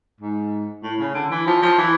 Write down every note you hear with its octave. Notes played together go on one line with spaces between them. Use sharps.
G#2
A2
C#3
D3
E3
F3
F3
E3